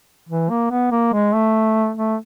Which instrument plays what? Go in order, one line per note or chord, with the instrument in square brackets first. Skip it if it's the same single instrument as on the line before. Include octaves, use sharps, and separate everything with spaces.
[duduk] E3
A#3
B3
A#3
G#3
A3
A3